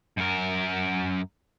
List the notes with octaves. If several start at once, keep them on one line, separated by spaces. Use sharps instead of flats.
F#2 A#4